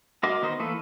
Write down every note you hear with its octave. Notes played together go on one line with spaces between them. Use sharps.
F#4 A#4 D#5 C6 D6
D#3 B3 D#4 C5 D#5
E3 A3 A#3 A4 B4